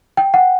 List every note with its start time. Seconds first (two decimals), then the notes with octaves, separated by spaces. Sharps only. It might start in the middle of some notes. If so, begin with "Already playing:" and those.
0.17 G5
0.34 F#5